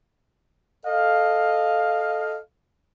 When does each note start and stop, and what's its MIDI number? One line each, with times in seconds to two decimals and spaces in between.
0.86 2.38 69
0.86 2.38 75
0.86 2.38 77